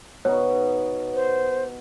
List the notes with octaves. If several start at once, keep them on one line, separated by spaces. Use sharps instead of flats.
B2 D#4 C#5
C5